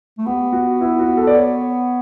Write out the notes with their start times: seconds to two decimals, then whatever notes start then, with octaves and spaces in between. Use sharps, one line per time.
0.18 A3
0.26 B3 G4
0.53 F#4
0.81 E4
0.99 F#4
1.17 A4
1.27 D5
1.36 C#5